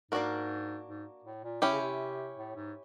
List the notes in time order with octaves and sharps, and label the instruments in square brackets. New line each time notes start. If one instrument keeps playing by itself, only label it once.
[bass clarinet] G#2 [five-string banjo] A#3 D4 F#4 A#4
[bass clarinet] G#2
A2
A#2
[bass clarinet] C3 [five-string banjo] C#4 E4 G4
[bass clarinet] C#3
C3
A2
G#2